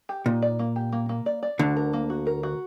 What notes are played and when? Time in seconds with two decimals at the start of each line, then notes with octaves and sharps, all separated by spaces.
0.09 G4
0.26 A#2 D#4
0.42 D5
0.59 A#3
0.76 G4
0.92 A#3
1.09 A#3
1.26 D5
1.43 D5
1.59 D2 D3 F#4
1.77 A#4
1.93 A#3
2.10 F#4
2.27 A#4
2.43 F#4